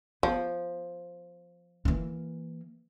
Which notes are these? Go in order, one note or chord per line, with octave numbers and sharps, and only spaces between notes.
F3 B3
E3 A#3